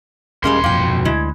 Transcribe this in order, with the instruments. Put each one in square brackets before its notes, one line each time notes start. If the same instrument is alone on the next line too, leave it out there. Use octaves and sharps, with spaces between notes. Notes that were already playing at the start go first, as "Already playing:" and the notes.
[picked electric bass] D#1 C#4 [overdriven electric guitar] B1 C6 [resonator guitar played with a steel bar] G3 G#3 A#3
[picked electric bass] E1 F#2 F3 [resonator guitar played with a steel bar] A#3 G5
[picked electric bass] D2 [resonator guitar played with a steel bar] G#3 E4